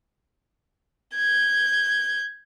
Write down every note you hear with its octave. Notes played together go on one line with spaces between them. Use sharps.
G6 G#6